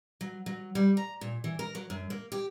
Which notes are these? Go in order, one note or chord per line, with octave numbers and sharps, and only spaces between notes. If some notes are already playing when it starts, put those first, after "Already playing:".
F#3
F#3
G3
A#5
A#2
E3
A#4
F#3
F#2
A#3
G4